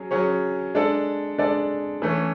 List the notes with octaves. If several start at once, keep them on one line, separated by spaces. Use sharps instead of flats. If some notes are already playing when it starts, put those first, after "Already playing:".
Already playing: F#3 C#4 G#4
F#3 C#4 G#4 C#5
G#3 D4 A4 D5
G#3 D4 A4 D5
E3 A3 C#4